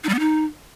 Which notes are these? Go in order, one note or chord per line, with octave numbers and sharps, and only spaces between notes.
D#4
G3
B3
D#4